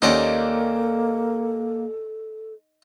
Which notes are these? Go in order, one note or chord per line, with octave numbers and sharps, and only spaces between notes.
D#2 A#3 C#4 D#4 A4 C5 D5 F#5